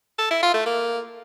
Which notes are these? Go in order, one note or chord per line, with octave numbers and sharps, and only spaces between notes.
A4
E4
F4
A3
A#3